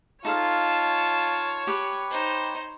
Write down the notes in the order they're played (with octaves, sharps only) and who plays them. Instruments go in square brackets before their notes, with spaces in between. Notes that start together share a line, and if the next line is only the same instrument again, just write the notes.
[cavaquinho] D#4 A4 F5 [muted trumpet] F4 [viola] C#5 [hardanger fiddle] A5
[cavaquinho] G4 B4
[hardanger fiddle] D#4 C5